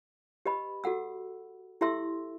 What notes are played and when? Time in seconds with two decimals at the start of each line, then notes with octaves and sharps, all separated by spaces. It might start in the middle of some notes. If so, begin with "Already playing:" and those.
0.46 G4 B4 D#5 B5
0.84 F#4 A4 F#5 E6
1.81 E4 G4 A4 E5 C6 E6